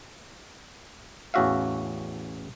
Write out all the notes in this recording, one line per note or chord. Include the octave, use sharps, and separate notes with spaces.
A1 E2 C#4 F#4 E5 F5